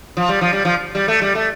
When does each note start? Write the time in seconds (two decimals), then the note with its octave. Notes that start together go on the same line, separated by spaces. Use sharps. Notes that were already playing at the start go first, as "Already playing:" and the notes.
0.17 F3
0.29 G3
0.41 F3
0.53 G3
0.65 F3
0.95 G3
1.08 A3
1.21 G3
1.35 A3